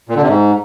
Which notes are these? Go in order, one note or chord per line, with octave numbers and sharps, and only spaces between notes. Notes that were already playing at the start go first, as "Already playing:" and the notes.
A#2
D3
C3
G#2